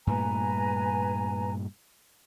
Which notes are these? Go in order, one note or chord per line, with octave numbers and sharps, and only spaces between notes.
G2 A#2 A3 B4 G#5 A#5